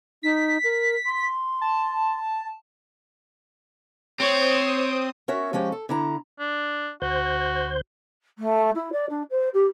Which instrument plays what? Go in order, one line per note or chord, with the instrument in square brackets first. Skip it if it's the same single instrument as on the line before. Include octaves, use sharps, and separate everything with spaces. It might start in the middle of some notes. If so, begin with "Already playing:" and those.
[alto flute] D#4 [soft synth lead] B6
[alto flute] A#4
C6
[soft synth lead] A5
[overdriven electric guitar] C4 [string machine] C5 D#6 [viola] C#5
[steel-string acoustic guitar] C#4 F#4 A#4 C#5 E5
F3 G#3 C#4 G4 C#5
A4
D3 E4 A#5
[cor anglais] D4
[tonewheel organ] D2 C5 G6 [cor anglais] F#4
[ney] A3
E4
D5
D4
C5
G4